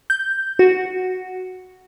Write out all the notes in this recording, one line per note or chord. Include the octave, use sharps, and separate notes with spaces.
G6
F#4